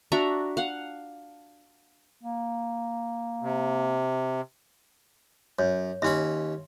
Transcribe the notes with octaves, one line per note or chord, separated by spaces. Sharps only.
D4 F#4 E5 A#5
F5 F#5
A#3
C3
F#2 C#5
D#2 C#4 E5 B5 C6